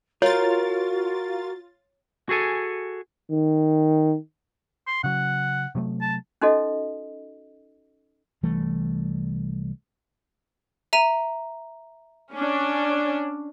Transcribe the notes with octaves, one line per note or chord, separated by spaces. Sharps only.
F4 F#4 A#4 C#5 A6
F#4 G#4 A4 G#5
D#3
C6
C#3 F#3 F#5
C3 F#3 A3
A5
C#4 D#4 F#4 A4 D#5
C2 E3 G3 A3
E5 A#5 D#7
C#4 D4